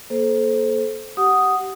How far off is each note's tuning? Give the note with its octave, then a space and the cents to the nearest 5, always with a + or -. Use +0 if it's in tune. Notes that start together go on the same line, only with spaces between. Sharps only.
A#3 +10 A4 -25 C5 +0
G4 -25 F#5 +0 D#6 +0